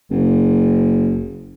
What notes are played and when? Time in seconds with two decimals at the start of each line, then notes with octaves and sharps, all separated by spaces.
0.10 F#1